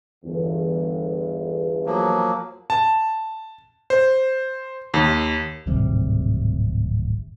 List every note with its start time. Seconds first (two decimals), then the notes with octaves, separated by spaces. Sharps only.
0.25 G1 E2
1.86 F3 F#3 A#3
2.70 A5
3.90 C5
4.94 D#2
5.67 D1 G#1 C3 G3